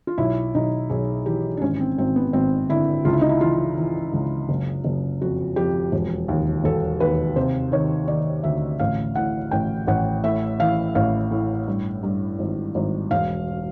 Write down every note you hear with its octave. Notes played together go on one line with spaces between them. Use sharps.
F4
B1 E4
B1 D#4
B1 G#4
E3 G4
D4
G#1 C#4
C4
G#1 C4
B3
G#1 C4
D3 E4
C#2 F4
E4
D#4
E4
E3 F4
E3
C#2
F#1
F#1
F2 F#4
F2 G4
E1
D#2
E1 A4
D#2 B4
C3 C5
D#3 C#5
D#3 D5
D2 E5
A1 F5
A2 F#5
A1 G5
A1 F#5
A2 E5
E3 F5
A1 F5
A2
G2
G2
G#1
G#1
E1 F5